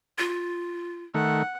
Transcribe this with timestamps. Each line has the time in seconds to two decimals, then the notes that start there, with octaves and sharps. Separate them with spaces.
0.18 F4
1.14 D#3 A3 F#5